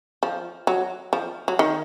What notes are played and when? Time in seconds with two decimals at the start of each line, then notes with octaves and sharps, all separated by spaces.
0.23 F3
0.67 F#3
1.13 F3
1.48 F#3
1.59 D#3